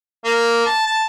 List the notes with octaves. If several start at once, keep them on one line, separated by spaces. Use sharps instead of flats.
A#3
A5
A5